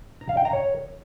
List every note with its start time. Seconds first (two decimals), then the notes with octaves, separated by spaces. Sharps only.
0.21 A#5
0.29 F5
0.37 G5
0.45 A#5
0.53 C#5